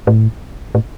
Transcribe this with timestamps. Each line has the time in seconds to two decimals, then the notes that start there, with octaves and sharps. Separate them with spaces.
0.07 A2
0.75 A2